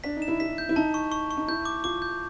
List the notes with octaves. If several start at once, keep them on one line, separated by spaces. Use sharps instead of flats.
D4 B6
D#4
E7
E4
E4 B6
G6
E4
D#4 A5
C#6
C#6
C#6
D#4
E4 G6
D6
F4 D6
G6